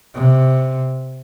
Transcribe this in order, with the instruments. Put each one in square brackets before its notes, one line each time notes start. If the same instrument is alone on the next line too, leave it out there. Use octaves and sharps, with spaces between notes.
[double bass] C3